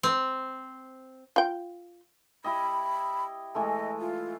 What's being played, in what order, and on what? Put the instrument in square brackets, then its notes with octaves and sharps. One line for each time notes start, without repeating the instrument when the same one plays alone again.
[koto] C4
[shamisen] F4 G5
[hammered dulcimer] E4 G4 D#5 [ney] B5
[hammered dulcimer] E3 G#3 A3 [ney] D#5
[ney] F4